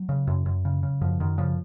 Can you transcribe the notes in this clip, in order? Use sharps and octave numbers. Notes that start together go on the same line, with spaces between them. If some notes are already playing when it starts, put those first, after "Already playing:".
Already playing: F#3
C#3
F#2
F#2
C#3
C#3
F#2 F3
F#2 D#3
C#3 F3